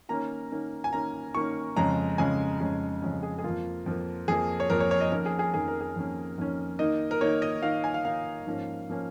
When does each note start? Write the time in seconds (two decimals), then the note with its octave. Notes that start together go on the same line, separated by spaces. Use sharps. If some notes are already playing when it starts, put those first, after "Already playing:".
0.09 D#3 A#3 C#4 A#5
0.51 D#3 A#3 C#4
0.84 G#5
0.93 D#3 A#3 C#4 A#5
1.35 D#3 A#3 C#4 C#6
1.76 F2 C#3 G#3 C#4 A#5
2.18 F2 C#3 G#3 C#4 G#5
2.60 F2 C#3 G#3 C#4
3.02 F2 C#3 G#3 C#4
3.23 G#4
3.39 G#4
3.44 F2 F3 A#3 F4
3.86 F2 F3 A#3
4.28 F2 F3 A#3 G#4
4.60 C#5
4.70 F2 F3 A#3 A#4
4.80 C#5
4.91 C#5
5.01 D#5
5.12 F2 D#3 A#3 C#4 A#4
5.26 G#4
5.39 G#4
5.53 F2 D#3 A#3 C#4 G#4
5.68 A#4
5.81 G#4
5.96 F2 D#3 A#3 C#4
6.38 F2 D#3 A#3 C#4
6.79 D#3 A#3 D#4 D#5
7.11 A#4
7.21 D#3 A#3 D#4 C#5
7.42 D#5
7.62 D#3 A#3 D#4 F5
7.84 G#5
7.94 F5
8.05 D#3 A#3 D#4 F5
8.46 G#2 F3 A#3 C#4
8.90 F3 A#3 C#4